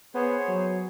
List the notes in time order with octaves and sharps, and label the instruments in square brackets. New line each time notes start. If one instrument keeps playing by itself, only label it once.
[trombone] B3 [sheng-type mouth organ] G#4 C5 C#5
[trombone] F#3